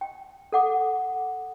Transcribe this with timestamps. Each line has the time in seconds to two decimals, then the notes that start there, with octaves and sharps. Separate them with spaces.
0.01 G5
0.52 A4 F#5 D6